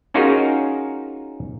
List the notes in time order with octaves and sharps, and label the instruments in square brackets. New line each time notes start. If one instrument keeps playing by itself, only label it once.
[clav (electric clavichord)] C#4 D#4 F4 F#4 G#4 A#4